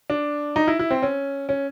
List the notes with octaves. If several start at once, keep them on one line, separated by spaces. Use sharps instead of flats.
D4
D#4
E4
E4
C4
C#4
C#4